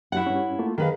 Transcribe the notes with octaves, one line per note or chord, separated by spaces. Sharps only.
E4 F#4 F#5
G2 C#4
A3 A#3 F4
D#3 G#4 B4 F5